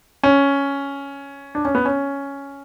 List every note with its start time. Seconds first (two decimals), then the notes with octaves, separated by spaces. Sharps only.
0.23 C#4
1.55 D4
1.65 C#4
1.75 B3
1.85 C#4